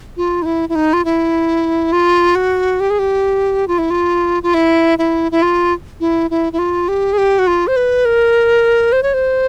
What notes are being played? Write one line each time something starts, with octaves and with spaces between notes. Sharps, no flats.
F4
D#4
E4
E4
D#4
F4
E4
F4
F#4
G4
G#4
G4
F4
E4
F4
F4
E4
E4
E4
F4
E4
E4
E4
F4
G4
G#4
G4
F#4
F4
C5
B4
A#4
C5
C#5
C5